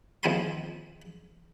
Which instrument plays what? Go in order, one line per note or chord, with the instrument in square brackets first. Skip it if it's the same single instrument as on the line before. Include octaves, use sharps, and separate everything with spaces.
[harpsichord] D#2 F3 C4 G#5 B5 C6